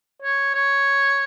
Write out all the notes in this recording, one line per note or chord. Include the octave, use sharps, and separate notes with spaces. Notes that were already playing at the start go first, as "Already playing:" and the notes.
C#5
C#5